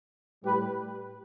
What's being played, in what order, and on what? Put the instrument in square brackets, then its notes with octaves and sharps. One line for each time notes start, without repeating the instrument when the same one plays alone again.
[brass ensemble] A2 G3 G4 B4